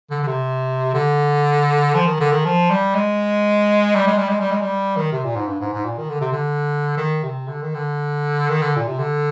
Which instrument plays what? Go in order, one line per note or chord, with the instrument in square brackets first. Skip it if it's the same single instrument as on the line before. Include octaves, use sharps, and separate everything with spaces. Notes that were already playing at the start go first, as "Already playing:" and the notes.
[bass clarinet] D3
D3
C3
D3
F3
D#3
D3
D#3
F3
G3
G#3
G3
G#3
G3
G#3
G3
G#3
G3
D#3
C3
A#2
G#2
G2
G#2
G#2
A#2
D#3
D3
C3
D3
D#3
C3
D3
D#3
D3
D#3
D3
A#2
C3
D3